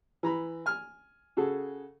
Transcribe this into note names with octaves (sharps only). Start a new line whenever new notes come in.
E3 A#5 B5
G#5 F6
C#3 F#4 G#4 A4